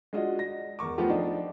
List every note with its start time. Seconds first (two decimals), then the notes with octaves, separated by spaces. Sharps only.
0.13 G#3 D4 F4 F#4 D#5
0.39 A#6
0.79 E2 A#4 C#6 D6
0.98 F3 A3 B3 F4 G4
1.10 F3 D4 D#4